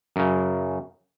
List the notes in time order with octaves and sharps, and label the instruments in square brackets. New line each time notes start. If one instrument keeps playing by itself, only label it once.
[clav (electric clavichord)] F#2 C#3